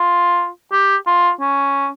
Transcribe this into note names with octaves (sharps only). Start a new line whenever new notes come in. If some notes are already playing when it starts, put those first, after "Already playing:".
Already playing: F4
G4
F4
C#4